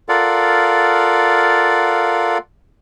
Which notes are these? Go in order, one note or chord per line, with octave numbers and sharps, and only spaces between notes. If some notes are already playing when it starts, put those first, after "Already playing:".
F4 A4 A#4 D5 F5 F#5